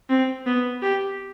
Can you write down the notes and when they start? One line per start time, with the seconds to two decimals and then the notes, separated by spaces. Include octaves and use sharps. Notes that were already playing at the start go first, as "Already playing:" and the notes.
0.09 C4
0.46 B3
0.82 G4